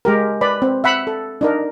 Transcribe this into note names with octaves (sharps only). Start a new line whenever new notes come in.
G#3 G4 A#4
B4 D5 B5
C4
E5 F#5 B5
A4
D4 D#4 A#4